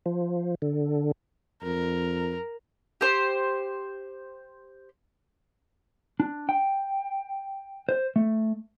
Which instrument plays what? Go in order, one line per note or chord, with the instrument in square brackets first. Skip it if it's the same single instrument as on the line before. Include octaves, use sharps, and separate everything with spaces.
[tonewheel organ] F3
D3
[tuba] F2 [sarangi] A#4
[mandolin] G4 C5
[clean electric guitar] D4
G5
C5
A3